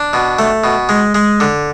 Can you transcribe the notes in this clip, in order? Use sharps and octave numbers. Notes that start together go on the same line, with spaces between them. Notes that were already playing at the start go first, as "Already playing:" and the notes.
Already playing: D4
B2
A3
B2
G#3
G#3
D3